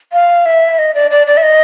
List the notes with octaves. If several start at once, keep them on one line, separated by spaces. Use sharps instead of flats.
F5
E5
D#5
D5
D5
D5
E5
D#5